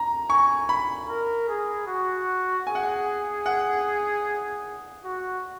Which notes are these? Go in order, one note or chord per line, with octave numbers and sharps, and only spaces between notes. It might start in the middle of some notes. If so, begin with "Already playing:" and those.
Already playing: A#5
G#5 C#6
B5
A#4
G#4
F#4
G#4 G#5
F#5
G#5
F#5
F#4